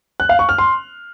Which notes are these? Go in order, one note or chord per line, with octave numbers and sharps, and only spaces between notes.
F#6
F5
C#6
F6
C6